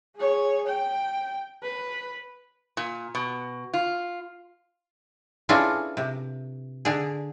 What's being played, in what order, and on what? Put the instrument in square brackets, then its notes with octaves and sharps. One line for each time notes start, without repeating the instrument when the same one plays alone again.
[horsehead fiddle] G#4 C#5
G5
B4
[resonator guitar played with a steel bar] A#2
B2
F4
[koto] E3 C#4 D4 F4 G#4 A4
C3
D3 G#4